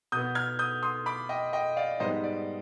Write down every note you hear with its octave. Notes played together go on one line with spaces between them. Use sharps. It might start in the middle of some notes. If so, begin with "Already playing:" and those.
B2 B3 D#6 G6
F6 G#6
D#6 G6
C6 D#6
B5 D6
D#5 G5
D#5 G5
D5 F5
G#2 G3 B3 C5 D#5
D5